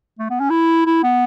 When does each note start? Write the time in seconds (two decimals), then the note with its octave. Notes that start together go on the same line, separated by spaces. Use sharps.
0.19 A3
0.30 B3
0.40 C#4
0.50 E4
0.86 E4
1.04 B3